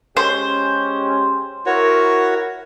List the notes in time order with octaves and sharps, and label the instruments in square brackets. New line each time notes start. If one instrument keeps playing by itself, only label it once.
[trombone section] G#3 C#4 G4 [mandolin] C5
[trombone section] E4 A#4 [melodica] F#4 C#5